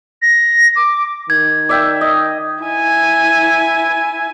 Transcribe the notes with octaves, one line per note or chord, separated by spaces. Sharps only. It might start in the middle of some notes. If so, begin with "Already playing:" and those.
A#6
D6
D#3 G#6
D5 E5 G5
D#5
E4 G#5